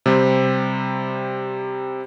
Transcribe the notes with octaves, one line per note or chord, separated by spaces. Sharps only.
C3 G3 C4